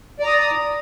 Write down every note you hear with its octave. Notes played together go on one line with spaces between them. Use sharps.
D5 A#5 D#6